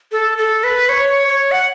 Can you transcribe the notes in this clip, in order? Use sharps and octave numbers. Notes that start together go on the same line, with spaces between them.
A4
A4
B4
C#5
C#5
F#5